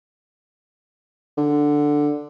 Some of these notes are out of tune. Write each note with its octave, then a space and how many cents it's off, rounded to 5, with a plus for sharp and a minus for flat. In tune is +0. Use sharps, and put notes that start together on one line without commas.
D3 +5